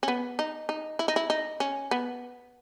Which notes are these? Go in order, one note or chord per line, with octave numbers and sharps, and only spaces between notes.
C#4
B3
D#4
D#4
E4
D#4
E4
D#4
C#4
B3